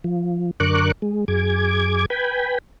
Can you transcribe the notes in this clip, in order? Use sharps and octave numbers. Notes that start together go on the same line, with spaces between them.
F3
F#2 D3 A#4 C#6 D6 F#6
G#3
F#2 G#4 D6 G#6
B4 G5 G#5 B5